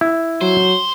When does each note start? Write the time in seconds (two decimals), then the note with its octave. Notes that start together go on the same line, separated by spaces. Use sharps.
0.01 E4
0.41 F#3 C5